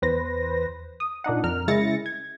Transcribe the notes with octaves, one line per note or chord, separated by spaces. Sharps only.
E2 B4 C5 A#6
D#6
A#2 D4 D#4 F#5
F2 A#4 F6
C#3 G#3 E4 A6 A#6 C#7
G#6